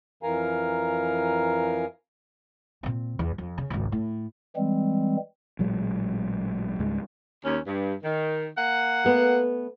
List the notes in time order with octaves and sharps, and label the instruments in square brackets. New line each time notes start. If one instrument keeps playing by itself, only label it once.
[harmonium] F2 E3 A#4 F5 G#5 A#5
[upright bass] A#2 C4
E2
F2
C#3
G#1 C#2
A2
[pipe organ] E3 G3 G#3 C4
[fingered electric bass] A1 A#2 F#3 G#3
C#2 G#2 G3 G#3
[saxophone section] D#2 C#4
G2
D#3
A#3 F#5
[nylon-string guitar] A3 B3